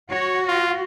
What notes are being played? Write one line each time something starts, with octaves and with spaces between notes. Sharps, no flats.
F#4 C#5
F4